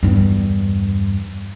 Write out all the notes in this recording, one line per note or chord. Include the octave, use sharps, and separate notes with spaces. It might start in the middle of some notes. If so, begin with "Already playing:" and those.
E2 G2